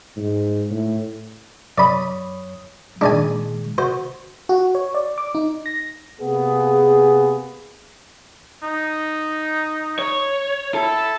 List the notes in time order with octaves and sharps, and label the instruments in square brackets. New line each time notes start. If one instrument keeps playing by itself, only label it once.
[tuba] G#2
A2
[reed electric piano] F#2 C#5 D#6 [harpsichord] D5 B5
[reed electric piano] A#2 D#3 G#3 [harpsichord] D4 D5 G#5
[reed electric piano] F#4 [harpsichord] C5
[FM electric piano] F#4
C#5
D5
D6
D#4
A#6
[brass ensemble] C3 A#3 B3 G#4
[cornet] D#4
[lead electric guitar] C#5
[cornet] E4 [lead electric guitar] A4